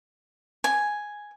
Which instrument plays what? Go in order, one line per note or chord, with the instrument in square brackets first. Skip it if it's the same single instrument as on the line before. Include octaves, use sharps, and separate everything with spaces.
[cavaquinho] G#5